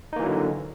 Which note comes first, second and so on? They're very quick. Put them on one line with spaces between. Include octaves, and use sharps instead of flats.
D#4 A#3 E3 F#3 D3